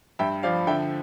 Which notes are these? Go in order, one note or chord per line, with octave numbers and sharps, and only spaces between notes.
G2 E5 G5
F3 D5 F5
D3 E5 G5